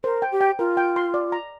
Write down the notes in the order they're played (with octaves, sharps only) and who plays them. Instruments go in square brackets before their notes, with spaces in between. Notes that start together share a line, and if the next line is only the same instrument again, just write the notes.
[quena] A#4 [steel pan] C5
[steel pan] G5
[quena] G4
[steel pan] G5
[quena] F4 [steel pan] A#4
[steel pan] G5
C6
D5
A#5